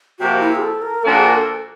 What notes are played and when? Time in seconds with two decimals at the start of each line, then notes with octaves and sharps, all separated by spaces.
0.19 C3 F3 A#3 F#4
0.40 E4
0.55 G#4
0.62 A4
0.82 A#4
1.03 A#2 F3 A#3 D4 F#4 A4
1.14 G#4
1.24 A#4
1.35 A4